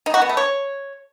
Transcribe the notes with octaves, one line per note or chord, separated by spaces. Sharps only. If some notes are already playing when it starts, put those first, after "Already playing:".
D#4
F#4
B3
A3
C#5